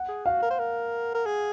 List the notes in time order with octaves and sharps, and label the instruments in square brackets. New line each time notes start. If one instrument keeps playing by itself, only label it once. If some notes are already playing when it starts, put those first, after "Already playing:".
Already playing: [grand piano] F#5
[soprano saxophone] G#4
[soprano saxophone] F#4 [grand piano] F5
[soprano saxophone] A#4
C5
A#4
A#4
G#4